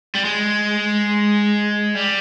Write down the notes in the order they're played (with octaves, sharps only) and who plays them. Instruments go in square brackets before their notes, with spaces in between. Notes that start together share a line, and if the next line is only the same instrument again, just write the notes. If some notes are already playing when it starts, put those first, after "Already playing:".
[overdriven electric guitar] G3
G#3
G3